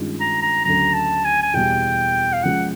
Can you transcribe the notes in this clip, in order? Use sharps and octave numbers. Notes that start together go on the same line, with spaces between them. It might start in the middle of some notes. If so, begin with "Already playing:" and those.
Already playing: G2 D#3 G#3 C#4 F4
A#5
A#5
D2 C#3 F#3 A#5
A5
G#5
G#5
E2 B2 G3 G5
F5
F3 G#3 C#4 F4 F#5